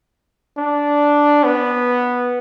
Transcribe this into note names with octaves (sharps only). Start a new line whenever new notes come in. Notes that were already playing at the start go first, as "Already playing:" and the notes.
D4
B3